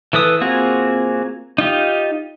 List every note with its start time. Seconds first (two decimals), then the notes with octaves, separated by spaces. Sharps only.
0.13 E3 A4 B4 D#6
0.41 A#3 C4 F4 F#4 G#4
1.58 D#4 F4 G4